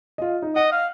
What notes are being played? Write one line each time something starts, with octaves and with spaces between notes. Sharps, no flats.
F4 D#5
D#4
D#5 F#5
F5